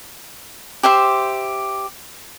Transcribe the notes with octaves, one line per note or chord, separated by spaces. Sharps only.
G4 C5 E5 C6